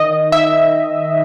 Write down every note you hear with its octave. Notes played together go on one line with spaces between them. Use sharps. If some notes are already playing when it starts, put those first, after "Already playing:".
Already playing: D#3 D#5
E5